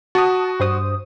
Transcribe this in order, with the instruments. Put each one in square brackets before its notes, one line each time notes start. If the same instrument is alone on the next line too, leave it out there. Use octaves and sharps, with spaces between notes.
[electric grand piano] F#4 [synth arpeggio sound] A5 D#6
[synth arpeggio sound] G2 C5 D#6